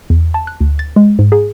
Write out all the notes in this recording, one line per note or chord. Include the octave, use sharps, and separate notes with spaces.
E2
A5
F#6
D2
A6
G#3
G#2
G#4